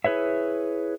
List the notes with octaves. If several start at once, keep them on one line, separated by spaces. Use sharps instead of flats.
E4 G#4 B4 C#5 E5